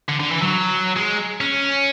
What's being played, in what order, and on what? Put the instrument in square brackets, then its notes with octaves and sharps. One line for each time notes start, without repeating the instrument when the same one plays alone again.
[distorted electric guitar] D3
D3
E3
F#3
G#3
C#4